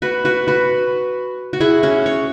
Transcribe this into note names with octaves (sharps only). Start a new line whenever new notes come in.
F#4 B4
F#4 B4
F#4 B4
F#4
E4 G#4
C#4 F#4
C#5